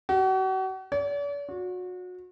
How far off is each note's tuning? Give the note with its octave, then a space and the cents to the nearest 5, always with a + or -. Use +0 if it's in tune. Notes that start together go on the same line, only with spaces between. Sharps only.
F#4 +40
D5 -45
F#4 -30